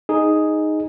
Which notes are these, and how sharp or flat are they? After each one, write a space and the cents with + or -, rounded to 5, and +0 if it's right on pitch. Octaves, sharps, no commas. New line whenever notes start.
D#4 +0 G#4 +0